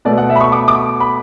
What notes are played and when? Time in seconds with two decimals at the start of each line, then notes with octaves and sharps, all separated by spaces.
0.05 B2 A3 D5
0.18 F#5
0.30 E5
0.36 B5
0.40 C#6
0.52 D6
0.68 D6
1.00 B5